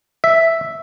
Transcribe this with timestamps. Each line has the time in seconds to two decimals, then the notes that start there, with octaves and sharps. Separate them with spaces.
0.24 E5